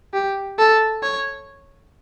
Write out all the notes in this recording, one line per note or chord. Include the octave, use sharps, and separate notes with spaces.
G4
A4
C#5